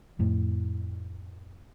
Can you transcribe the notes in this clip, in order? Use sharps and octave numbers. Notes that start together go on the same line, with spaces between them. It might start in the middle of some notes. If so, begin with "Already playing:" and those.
F2 A2